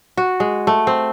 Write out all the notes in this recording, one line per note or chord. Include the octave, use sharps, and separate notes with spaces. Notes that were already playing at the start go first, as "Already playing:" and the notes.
F#4
G#3
A3
C4